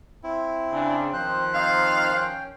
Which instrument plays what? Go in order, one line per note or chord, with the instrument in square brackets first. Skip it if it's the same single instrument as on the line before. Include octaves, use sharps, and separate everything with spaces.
[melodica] C4 [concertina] E4
[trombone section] C#3 D4
[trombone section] D#3 F3 [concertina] C5 F#6
[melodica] C4 D#4 F4 [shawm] F5
[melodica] C#4 G5